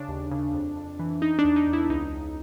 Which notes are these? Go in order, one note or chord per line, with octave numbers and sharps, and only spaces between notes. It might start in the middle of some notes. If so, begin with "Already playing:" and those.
Already playing: C#3 D4
D#2
C#3
F2
F2
E3
E3 D#4
D4
E2
D#4
E2
E4
C#2 D#4
C#2